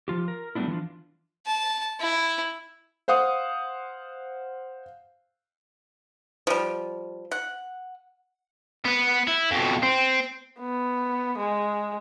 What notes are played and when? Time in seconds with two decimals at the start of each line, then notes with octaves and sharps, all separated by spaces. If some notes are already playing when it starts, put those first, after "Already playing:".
0.08 F3 F4 G4
0.28 A#4
0.55 F#3 G3 A3 B3 D4 E4
0.68 E3 F3 D4 F4
1.46 A5
2.00 E4
3.08 C5 F5 F#5 D#6
6.47 F3 G3
7.31 F#5
8.85 B3 B4
9.28 E4
9.51 F2 B2
9.83 C4
10.59 B3
11.38 G#3